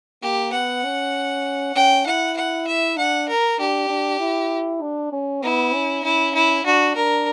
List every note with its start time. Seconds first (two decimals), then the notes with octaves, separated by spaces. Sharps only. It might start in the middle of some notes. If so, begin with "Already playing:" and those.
0.22 A#3 G4
0.53 B3 F#5
0.84 C#4
1.76 C#4 G5
2.06 E4 F#5
2.37 F#5
2.68 E5
2.98 D4 F#5
3.28 A#4
3.59 D4 G4
3.90 D4
4.20 E4
4.81 D4
5.13 C#4
5.42 B3 E4
5.74 C#4
6.04 C#4 E4
6.35 E4
6.65 D4 F#4
6.95 D4 A#4